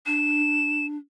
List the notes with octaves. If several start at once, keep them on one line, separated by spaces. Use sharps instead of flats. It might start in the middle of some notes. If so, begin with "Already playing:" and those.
D4 E7